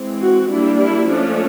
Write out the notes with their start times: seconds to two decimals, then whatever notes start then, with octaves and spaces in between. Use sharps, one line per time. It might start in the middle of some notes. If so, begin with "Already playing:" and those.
Already playing: E3 G#3 C4
0.22 F#4
0.51 G3 A#3 D4 E4
0.80 E4
1.08 F3 A3 C#4 D4